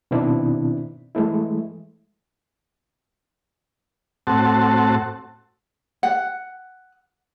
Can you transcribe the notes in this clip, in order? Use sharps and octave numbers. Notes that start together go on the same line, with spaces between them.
B2 D#3 C4 D4 E4
E3 G#3 A3 E4
A2 C4 F#4 A5
F#5